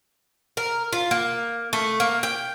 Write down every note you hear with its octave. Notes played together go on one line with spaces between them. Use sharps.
A#4
F4
A#3
A3
A#3
G5